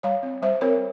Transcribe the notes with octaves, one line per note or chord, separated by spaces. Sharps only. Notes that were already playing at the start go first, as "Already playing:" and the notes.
G3 C#5 F5
C4
G3 C5 E5
C4 A#4 C#5